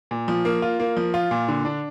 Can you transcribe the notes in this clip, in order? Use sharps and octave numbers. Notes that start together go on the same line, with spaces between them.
A#2
F3
A#3
F4
A#3
F3
F4
A#2
D3
D4